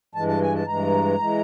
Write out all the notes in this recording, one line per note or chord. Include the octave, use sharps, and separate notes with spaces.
G2 E3 G#3 A5
A5
G#5
A5
G2 E3 G#3 A#5
E3 G#3